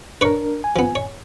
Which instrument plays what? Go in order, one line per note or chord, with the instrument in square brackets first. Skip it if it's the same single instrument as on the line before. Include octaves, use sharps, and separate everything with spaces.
[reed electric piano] D4 A#4 [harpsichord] B4 C#5 C#6
[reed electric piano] G#5
[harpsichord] F3 B3
C#5